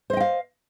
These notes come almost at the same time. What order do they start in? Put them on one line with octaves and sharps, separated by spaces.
C5 D#5 G5 F5